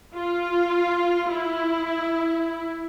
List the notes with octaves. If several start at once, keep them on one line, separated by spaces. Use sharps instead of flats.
F4
E4